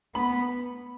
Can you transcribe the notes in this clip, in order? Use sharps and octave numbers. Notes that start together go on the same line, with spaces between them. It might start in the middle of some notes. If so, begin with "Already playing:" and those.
B3 B5